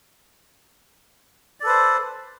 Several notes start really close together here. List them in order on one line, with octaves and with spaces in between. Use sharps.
D5 A4 B4 C5